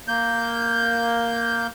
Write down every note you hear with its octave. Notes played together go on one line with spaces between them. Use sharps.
A#3 G6